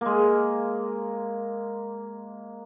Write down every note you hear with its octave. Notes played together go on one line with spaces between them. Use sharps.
G#3 A#3